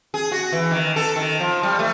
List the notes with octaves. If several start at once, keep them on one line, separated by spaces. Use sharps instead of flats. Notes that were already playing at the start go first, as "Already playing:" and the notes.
G#4
F#4
E3
D#3
A4
D#3
F3
G3
A3